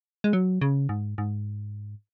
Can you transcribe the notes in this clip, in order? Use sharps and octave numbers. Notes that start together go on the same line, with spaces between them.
G#3
F#3
C#3
G#2
G#2